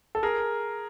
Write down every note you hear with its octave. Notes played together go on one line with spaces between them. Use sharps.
A4
G#4 A#4